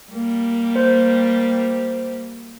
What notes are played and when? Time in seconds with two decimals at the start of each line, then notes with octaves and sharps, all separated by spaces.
0.12 G3 A#3 G4
0.76 C5